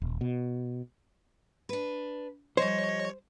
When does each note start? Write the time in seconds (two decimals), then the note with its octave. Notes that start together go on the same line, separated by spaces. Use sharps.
0.02 D#1
0.21 B2
1.69 D4 B4
2.57 F3 G3 C5 C#5 D#5